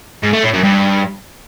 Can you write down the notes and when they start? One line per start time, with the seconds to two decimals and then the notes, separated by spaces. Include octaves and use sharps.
0.23 G#2
0.33 A3
0.43 A2
0.53 F#2
0.63 G2